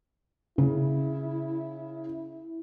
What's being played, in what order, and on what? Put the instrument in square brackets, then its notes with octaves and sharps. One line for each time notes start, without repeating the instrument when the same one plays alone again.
[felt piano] C#3 [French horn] E4